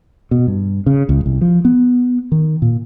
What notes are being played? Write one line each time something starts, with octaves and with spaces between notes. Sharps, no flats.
B2
G2
C#3
C#2
C2
F3
B3
D#3
A#2